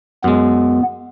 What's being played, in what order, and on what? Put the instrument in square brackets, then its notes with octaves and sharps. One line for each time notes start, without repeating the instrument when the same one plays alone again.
[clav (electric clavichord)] F#2 G#3 [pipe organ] B3